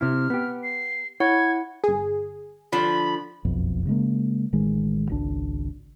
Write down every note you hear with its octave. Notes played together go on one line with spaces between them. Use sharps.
C3 E4 F6
B3 G4
C7
E4 C#5 F#5 G#6
G1 G#4
D3 F3 B5
F#1 B1 F2
C#3 G#3 A#3
A1 D#3 G#3
G#1 C#2 D4